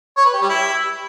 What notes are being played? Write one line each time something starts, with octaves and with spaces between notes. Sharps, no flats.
C#5
B4
G4
G3
E4